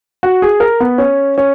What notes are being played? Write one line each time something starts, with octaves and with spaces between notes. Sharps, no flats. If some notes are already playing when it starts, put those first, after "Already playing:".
F#4
G#4
A#4
B3
C#4
C#4